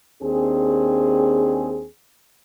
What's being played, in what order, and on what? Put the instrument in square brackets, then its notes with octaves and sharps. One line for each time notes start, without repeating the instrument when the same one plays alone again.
[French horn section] D#2 C4 D4 G#4